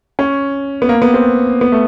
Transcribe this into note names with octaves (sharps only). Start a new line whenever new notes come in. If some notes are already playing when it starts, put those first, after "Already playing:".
C#4
B3
A#3
B3
C4
B3
A3